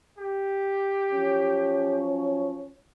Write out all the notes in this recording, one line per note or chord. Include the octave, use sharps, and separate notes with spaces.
G4
F3 F#3 C#4